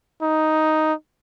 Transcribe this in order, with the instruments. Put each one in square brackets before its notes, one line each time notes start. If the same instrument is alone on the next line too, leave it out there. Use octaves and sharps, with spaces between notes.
[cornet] D#4